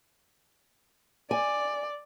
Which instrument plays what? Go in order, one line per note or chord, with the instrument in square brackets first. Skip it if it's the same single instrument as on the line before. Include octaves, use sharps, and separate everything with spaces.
[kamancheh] D5 [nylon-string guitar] G#5